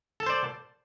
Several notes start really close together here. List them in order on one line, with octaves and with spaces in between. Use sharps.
A4 A5 C5 D5